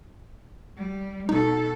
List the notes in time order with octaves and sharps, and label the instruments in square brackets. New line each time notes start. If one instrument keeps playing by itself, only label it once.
[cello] G3
[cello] B2 A4 [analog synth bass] D#4